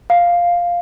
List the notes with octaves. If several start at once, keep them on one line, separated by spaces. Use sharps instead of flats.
F5